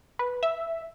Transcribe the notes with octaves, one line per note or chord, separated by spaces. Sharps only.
B4
E5